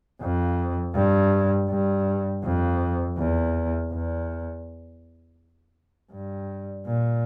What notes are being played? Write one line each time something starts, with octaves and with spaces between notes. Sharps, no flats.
F2
G2
G2
F2
E2
E2
G2
A#2